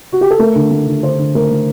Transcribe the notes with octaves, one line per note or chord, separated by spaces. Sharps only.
F#4
G4
A4
A3 A#4
D3
A3
D3
D3 C5
D3
A3 A#4
A3